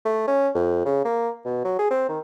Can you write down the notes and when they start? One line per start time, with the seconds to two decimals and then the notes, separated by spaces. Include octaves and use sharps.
0.05 A3
0.28 C#4
0.55 F2
0.85 C#3
1.05 A#3
1.45 B2
1.64 F#3
1.79 G#4
1.90 C4
2.09 D#3